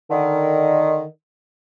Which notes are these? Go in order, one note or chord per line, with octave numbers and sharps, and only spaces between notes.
D3 D#3